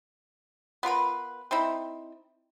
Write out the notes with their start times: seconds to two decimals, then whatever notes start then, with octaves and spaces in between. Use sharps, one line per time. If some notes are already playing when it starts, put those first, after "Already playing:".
0.83 B3 F4 A#4 B4
1.51 C4 D#4 E4